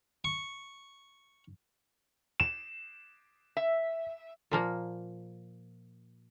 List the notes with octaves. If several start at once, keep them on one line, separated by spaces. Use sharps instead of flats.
C#6
E7
E5
A#2 F3 A#3